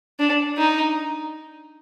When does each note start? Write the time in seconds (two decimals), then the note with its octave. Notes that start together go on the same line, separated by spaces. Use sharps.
0.19 D4
0.57 D#4